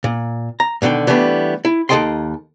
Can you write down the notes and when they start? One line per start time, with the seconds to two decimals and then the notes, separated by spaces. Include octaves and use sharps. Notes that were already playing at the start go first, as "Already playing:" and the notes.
0.04 A#2
0.60 A#5
0.82 G#2 B2 D3 D#3 G5
1.07 E3 G3 A3 B3 D4
1.65 E4
1.89 D#2 C3 A4 D#5 G5 C6